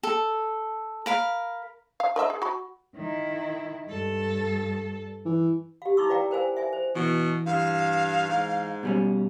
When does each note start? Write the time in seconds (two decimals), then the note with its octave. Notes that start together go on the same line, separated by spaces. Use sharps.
0.03 A4
1.06 A#4 F5 B5
2.00 F5
2.16 A#4 D#5 E5
2.30 G#4
2.42 F#4 B5
2.95 D#3 E4
3.88 G2 A4
5.25 E3
5.82 G4 F5
5.97 D#4 E4 C#6 D6 E6
6.09 F4 B4 D5 F5 G5 A#5
6.31 A#4 C5 F5 G#5
6.57 E5 G#5
6.73 C5
6.95 B2 E3
7.46 G2 F5
8.28 G#2
8.83 B2 G3 C#4